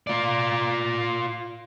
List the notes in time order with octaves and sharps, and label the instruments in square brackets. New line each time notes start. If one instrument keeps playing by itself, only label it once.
[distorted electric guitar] F4 D5